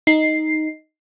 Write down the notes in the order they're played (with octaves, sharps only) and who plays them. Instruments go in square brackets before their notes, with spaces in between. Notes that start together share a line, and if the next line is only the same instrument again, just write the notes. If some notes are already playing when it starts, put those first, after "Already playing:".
[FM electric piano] D#4 C7